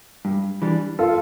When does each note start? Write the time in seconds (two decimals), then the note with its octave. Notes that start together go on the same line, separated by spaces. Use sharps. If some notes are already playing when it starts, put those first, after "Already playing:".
0.25 G2
0.62 E3 G3 D4
0.99 F4 A4